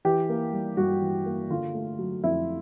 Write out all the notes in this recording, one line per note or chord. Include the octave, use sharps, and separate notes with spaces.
E3 G4
A#3
G3
G2 F#4
E3
A#3
D3 F4
A3
F#3
F2 E4